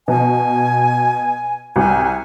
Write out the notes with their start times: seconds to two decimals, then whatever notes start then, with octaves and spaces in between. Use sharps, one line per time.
0.08 B2 G#5
1.76 C2 G#5